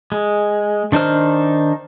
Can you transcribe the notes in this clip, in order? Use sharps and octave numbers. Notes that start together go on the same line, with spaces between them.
G#3
D#3 D4 D#4 C5 F6